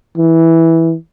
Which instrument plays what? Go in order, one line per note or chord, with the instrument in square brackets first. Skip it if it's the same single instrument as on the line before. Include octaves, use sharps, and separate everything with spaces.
[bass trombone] E3